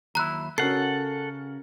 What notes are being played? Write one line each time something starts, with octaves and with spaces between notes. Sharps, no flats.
D#2 F#3 E4 A#5 F#6
C#3 C#4 F#4 A4 A#4 F#5 C7